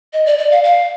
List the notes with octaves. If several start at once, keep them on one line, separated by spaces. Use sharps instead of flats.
D#5
D5
D5
F5
F5